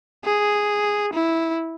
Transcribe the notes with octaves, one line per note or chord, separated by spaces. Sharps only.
G#4
E4